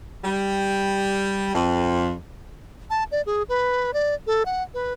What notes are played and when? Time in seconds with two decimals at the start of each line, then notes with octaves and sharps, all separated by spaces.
0.24 G3
1.54 F2
2.90 A5
3.12 D5
3.26 G#4
3.49 B4
3.94 D5
4.27 A4
4.46 F#5
4.74 B4